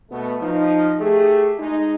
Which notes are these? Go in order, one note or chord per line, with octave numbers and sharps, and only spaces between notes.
B2 A3 B3
F3 D#4
A3 G4 G#4
G#3 D#4